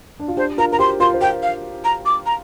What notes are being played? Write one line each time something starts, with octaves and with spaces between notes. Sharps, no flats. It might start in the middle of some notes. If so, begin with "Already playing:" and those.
D4
F4
D4 G4 C5
F4 A#4 A#5
A#4 A#5
G4 C5 C6
F4 A#4 C6
C5
F4 A#4 G5
F5
A#5
D6
A#5